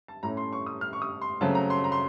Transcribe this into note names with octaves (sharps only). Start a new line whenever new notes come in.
A5
A2 A3 C#4 A#5
C6
C#6
D#6
F6
C#6
D#6
C6
C#3 F#3 A3 C4 A5
A#5
C6
A#5
C6